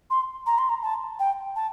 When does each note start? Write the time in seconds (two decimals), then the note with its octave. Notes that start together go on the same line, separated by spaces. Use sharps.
0.10 C6
0.46 A#5
0.58 C6
0.69 A#5
0.82 A5
1.20 G5
1.56 A5